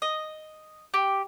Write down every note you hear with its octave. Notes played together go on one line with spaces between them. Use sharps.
D#5
G4